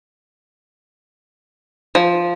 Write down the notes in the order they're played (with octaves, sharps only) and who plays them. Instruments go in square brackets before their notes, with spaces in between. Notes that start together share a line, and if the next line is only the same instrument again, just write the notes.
[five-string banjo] F3